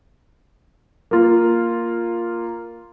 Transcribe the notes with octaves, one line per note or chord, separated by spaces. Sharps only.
A#3 F4